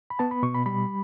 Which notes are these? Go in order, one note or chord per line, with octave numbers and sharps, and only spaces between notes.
B5
B3 A5
B5
B2 C#6
B5
G3 B5